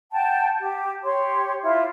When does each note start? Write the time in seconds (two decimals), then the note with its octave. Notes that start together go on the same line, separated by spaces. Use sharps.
0.12 F#5 G5 A5
0.61 G4
1.04 G4 C#5 C6
1.63 E4 F4